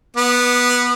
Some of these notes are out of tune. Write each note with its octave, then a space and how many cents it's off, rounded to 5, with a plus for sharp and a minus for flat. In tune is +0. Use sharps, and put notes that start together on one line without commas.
B3 -10 D#6 -40